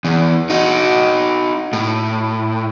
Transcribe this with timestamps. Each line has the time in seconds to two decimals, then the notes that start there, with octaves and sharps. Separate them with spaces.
0.05 E2
0.50 D#4 F#4
1.73 A2